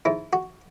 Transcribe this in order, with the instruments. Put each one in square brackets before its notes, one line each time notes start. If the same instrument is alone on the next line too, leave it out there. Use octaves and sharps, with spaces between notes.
[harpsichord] G#2 E4
F#4